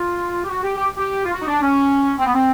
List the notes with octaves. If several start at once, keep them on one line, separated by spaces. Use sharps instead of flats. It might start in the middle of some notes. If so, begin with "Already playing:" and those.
Already playing: F4
G4
F#4
G4
G4
G4
F4
F#4
D#4
D4
C#4
C4
B3
C4